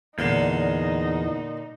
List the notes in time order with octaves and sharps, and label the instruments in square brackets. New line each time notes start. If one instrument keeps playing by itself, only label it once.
[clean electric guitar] E2 [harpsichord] A#2 D3 [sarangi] D#4